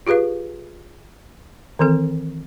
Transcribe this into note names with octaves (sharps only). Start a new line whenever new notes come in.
F4 G4 G#4 B4 F5
D#3 E3 C4 A4